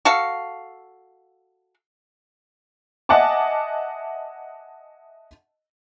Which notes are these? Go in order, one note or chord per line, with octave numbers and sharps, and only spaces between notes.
F#4 A4 F5
D#5 E5 F#5 G#5 A5 D6